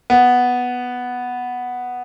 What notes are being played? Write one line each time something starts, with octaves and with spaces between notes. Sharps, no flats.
B3